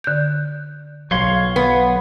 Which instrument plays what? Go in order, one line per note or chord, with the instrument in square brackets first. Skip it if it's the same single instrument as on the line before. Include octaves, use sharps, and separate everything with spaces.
[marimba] D3 G6
[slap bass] B1 F#3 [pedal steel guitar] C#5 F5 C6
[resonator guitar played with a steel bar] B3